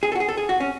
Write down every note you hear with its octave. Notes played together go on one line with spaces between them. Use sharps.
G#4
A4
F#4
G#4
A4
G#4
F#4
C#4